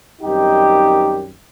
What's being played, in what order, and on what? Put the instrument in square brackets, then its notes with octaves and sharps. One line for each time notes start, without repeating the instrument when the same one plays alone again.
[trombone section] F#2 D#3 G3 C4 D#4 G4